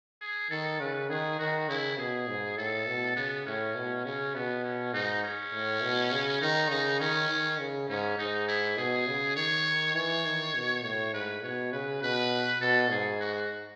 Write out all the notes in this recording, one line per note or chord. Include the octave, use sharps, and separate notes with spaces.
G#4
D#3 A4
C#3 B4
D#3 G#4
D#3 F#4
C#3 E4
B2 G#4
G#2
A2 A4
B2
C#3 B3
A2 C#4
B2
C#3 C#4
B2 B3
C#4
G#2 D#4
C#4
A2
B2
C#3
D#3 D#4
C#3 D#4
D#3 C#4
D#3
C#3
G#2 C#4
G#2 D#4
E4
B2 G#4
C#3
D#3 C#5
E3 C#5
D#3
B2
A2 C#5
G#2 B4
B2 C#5
C#3 B4
B2 B4
B2 A4
G#2 G#4
F#4